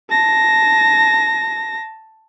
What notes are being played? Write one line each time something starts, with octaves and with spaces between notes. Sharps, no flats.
A5 A#6